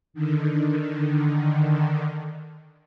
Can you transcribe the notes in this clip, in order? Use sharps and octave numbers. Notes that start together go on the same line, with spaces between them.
D3 D#3